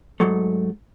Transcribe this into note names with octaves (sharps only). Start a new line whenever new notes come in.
G#2 F#3 A3